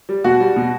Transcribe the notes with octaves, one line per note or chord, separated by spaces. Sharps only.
G3
B2 F#4
G3
B2